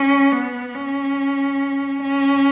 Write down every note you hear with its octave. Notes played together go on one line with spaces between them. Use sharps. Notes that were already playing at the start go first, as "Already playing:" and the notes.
Already playing: C#4
B3
C#4
C#4